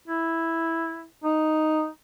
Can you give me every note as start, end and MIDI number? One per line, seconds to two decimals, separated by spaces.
0.08 1.06 64
1.24 1.87 63